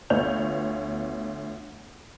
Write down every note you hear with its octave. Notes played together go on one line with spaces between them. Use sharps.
D2 B3 F4 C#5 G6 F7